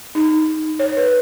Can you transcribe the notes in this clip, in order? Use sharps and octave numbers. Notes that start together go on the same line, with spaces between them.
D#4
C#5
B4